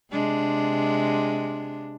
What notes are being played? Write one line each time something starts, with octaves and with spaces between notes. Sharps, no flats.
C3 G#3 D4